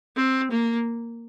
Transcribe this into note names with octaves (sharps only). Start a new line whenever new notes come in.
C4
A#3